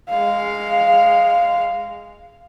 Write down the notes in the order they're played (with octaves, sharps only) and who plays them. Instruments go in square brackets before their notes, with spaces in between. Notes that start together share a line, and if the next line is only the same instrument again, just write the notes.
[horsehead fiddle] G#3 F5